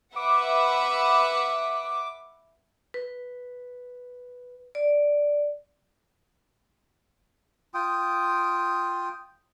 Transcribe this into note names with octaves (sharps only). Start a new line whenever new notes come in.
B4 E5 F#5 D6
B4
D5
F4 G5 D#6